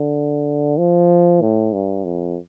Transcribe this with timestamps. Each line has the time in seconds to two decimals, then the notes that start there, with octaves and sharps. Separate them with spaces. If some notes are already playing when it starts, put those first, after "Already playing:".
Already playing: D3
0.79 F3
1.42 A2
1.73 G2
2.05 F2